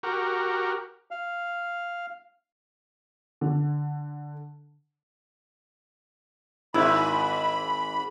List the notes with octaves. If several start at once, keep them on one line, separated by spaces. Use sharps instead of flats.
F#4 G4 A#4
F5
D3
G#1 G#2 E4 B5